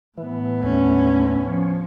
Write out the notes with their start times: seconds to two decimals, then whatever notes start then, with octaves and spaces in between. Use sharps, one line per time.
0.18 A2 E3 B3
0.63 D#2 D3 A3 C#4
1.45 F3 C#4